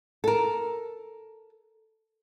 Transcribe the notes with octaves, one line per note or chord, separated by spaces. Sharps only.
A4 A#4